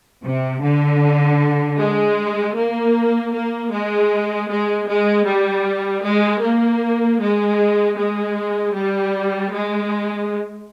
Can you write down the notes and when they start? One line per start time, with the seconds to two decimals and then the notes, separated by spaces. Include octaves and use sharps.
0.24 C3
0.62 D3
1.79 G#3
2.56 A#3
3.34 A#3
3.73 G#3
4.50 G#3
4.88 G#3
5.26 G3
6.04 G#3
6.42 A#3
7.21 G#3
7.97 G#3
8.75 G3
9.53 G#3